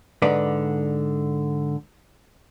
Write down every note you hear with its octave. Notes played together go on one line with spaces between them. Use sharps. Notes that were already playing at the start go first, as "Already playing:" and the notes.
G#2 D3 B4 D5